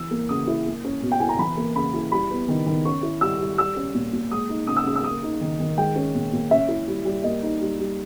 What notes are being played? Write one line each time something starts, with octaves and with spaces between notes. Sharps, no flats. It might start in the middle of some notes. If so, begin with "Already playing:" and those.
Already playing: E3 E6
A#3
C#3 D#6
E4
A#3
C#4
B2
G5
E4 G#5
A#5
E3 B5
A#3
C#3 B5
E4
G3 B5
B3
D#3
D#3
C#4 C#6
E4
G3 E6
G3
G3 E6
C#4
A#2
A#2
G#3 D#6
D#4
C#3 D#6
E6
C#3 D#6
E6
A#3 D#6
D#4
D#3
D#3
G#3 G5
C#4
A#2
A#2
C#4 E5
E4
G3
G3
A#3 D#5
D#4
G3
G3